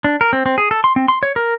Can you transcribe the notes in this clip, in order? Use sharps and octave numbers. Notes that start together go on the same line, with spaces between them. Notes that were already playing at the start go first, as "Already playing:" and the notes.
D4
A#4
C4
C4
G#4
A4
C6
C4
C6
C#5
A#4